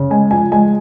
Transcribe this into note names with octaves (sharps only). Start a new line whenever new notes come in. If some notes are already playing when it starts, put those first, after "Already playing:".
Already playing: C#3
G#3 G#5
F3 G#5
G#3 G#5